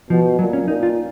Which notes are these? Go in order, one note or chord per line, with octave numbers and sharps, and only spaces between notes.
B2 F3
A#2 F#3
C#4
A#2 D#4
F4